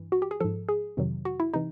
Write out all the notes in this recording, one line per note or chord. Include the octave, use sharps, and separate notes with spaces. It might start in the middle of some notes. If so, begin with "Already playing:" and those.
Already playing: G2 E3
F#4
G4
G#4
G#2 F3 A4
G#4
F2 C3 D#3 F#3
F#4
E4
C3 E3 D#4